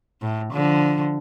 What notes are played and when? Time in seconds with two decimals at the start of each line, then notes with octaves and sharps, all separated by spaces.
0.22 A2
0.53 D3 F3